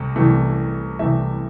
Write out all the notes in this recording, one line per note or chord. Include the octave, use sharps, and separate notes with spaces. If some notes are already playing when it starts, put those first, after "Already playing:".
Already playing: C2 C3 A3
C2 C3 E3 A3
C2 C3 E3 A3 E5